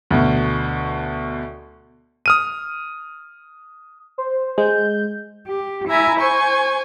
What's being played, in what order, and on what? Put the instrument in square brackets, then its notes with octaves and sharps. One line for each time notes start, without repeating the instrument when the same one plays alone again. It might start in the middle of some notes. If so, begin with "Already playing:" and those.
[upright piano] D2 B2
[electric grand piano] D#6 F6 D#7
[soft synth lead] C5
[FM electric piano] G#3 [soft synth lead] G6
[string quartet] G4
E4 E5 G#5 A#5
C5 G#5 C#6